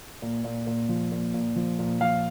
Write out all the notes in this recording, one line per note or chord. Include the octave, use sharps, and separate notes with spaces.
A#2
A#2
A#2
F3
A#2
A#2
F3
A#2
F3 F5